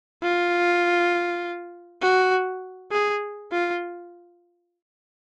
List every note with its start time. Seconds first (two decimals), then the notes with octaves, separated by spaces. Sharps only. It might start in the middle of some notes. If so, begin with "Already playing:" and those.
0.23 F4
2.02 F#4
2.92 G#4
3.52 F4